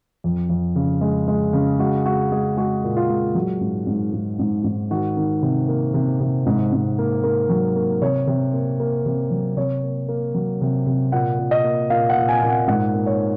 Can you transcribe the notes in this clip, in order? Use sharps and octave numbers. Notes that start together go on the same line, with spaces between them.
F2
F2
C#3
G#3
G#3
C#3
G#3 F#4
G#3 F#4
G#3 G#4
G#3 F#4
A#2
F4
G#3
F#3 F#4
G#2
G#2
G#2
G#2
G#2
D#3 F#4
D#3
C3
A#3
C3
C3
G#2
G#2
A#3
A#3
F#3
A#3
C3 C#5
C3
A#3
A#3
C3
F#3
C3 C#5
A#3
A#3
F#3
C3
C3
A#2 F#5
A#2
D#5
A#3
A#2 F5
F#5
A#2
G#5
A#2
F#5
G#2 F#5
A#3
C#5